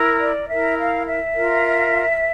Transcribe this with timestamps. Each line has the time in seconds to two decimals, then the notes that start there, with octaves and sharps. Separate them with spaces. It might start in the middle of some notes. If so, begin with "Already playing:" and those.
Already playing: E4 A#4
0.20 D5
0.48 E4 A#4 E5
0.77 F5
1.07 E5
1.36 F4 A#4